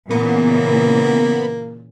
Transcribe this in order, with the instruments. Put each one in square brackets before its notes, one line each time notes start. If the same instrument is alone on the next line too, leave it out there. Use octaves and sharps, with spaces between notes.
[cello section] A#2 C#3 E3 [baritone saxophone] A#3 [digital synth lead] B3